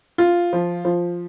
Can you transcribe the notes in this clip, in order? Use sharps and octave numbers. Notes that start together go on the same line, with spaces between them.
F4
F3
F3